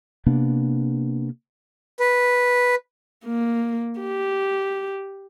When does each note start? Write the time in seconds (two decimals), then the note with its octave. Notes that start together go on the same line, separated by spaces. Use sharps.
0.26 C3 A#3 B3 D4
2.00 B4
3.25 A#3
4.00 G4